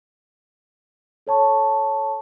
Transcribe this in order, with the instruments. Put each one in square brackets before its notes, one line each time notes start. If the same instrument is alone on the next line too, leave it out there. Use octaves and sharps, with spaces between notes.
[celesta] A4 C#5 A5 C#6